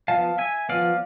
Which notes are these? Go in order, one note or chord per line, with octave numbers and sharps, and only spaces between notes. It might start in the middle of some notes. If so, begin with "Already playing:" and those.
F3 B3 F5 A5
E5 G#5
F3 B3 D5 F5